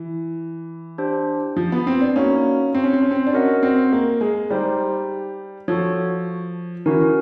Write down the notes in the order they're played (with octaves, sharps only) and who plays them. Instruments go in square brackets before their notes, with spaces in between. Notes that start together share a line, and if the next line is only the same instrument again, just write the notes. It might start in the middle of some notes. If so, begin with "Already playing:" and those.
Already playing: [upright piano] E3
[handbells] D4 G4 C5
[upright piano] F3
B3
C4
D4
[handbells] A#3 D#4 F#4 [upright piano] C#4
[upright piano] C4
C#4
C4
C#4
C4
D4
[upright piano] C#4 [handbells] F#4 A#4 D#5 F#5
[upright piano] C4
A#3
G#3
[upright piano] G3 [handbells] D#4 G4 C5
[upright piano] F3 [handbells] F#4 A4 C#5
[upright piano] E3 [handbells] C#4 F#4 A#4